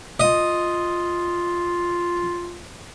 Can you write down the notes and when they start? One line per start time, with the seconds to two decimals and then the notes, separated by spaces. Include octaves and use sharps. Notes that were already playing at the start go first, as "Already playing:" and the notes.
0.20 F4 D#5